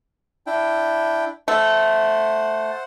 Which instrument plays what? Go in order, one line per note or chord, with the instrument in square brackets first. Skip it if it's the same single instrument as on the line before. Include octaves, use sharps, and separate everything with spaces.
[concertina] D4 E4 G5
[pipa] A3 [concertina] C5 F#5